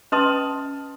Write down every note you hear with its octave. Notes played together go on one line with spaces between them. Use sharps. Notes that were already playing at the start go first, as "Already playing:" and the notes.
C#4 B4 D#5 A5 C6 D#6